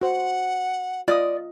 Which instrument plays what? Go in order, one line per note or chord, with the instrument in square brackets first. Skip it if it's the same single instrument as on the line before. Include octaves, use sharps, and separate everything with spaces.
[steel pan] F#4 C5 [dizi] F#5
[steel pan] F4 D#5 [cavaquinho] D5 D#6